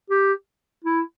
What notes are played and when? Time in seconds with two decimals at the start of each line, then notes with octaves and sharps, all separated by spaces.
0.10 G4
0.84 E4